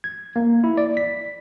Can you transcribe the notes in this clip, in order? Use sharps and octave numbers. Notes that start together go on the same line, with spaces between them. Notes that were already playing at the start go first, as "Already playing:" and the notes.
G#6
A#3
E4
D5
B6